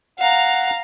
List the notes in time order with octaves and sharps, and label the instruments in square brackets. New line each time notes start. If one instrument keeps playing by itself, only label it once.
[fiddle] F5 A#5 [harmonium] F#5